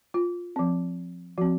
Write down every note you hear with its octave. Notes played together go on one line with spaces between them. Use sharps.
F4
F3 C4
F3 C4 F#4